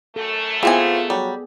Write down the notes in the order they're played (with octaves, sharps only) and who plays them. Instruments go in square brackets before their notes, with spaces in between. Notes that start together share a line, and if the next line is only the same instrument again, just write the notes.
[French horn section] F#2 A3 [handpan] A4
[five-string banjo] E3 C4 G#5 [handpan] B3 G#4 [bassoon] F4
[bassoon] F#3 [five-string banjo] G3